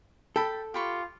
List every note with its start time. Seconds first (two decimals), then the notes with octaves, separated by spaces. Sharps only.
0.36 A4 G5 A5 B5
0.74 F4 G4 B5 C#6